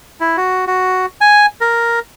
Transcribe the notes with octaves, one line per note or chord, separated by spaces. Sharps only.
E4
F#4
F#4
G#5
A#4